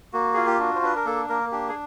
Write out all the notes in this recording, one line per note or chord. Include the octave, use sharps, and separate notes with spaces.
A#3 F#4
F4 G#4
G4
D4 F#4
C5
D4 B4
A#4
A#3 A4
A#3 A#4
D4 G4
G#4